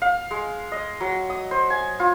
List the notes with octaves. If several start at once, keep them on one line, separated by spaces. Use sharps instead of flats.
F5
G#3
D#5
F#3
D#6
C5
G#5
F4